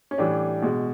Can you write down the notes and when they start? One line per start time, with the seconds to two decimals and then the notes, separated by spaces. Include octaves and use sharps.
0.11 C#4
0.18 A2 E3 G3 D4
0.62 B2 G#3